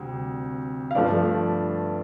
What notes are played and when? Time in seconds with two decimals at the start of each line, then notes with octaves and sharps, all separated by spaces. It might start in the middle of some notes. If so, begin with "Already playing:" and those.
Already playing: D2 C3 G3 C4
0.91 F5
0.95 G2 F3 A3 D5